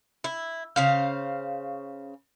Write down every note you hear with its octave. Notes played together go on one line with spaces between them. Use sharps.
E4
C#3 C5 F5